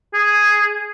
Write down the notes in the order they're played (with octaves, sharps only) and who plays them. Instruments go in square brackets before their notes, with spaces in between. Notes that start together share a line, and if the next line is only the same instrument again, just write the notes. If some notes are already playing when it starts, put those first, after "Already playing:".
[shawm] G#4